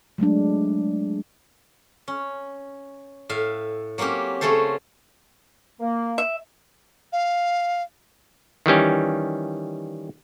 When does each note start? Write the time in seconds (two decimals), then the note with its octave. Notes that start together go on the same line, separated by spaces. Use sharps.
0.18 F#3 G#3 A3 D4
2.08 C#4
3.29 A2 E5 F5
3.98 F#3 A#3 C4 C#4 G4
4.41 C#3 F#3 A3 C#4 A4 C5
5.80 A#3
6.18 E5
7.12 F5
8.66 D#3 E3 G3 C#4